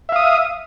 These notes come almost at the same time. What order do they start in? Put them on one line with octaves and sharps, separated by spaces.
E5 F5 D#6